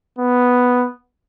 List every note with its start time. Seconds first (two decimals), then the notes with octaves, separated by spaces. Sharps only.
0.19 B3